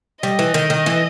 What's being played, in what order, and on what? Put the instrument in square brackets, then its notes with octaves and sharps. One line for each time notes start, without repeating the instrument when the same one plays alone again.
[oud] G3 [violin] D#5
[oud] E3
D#3
D#3
E3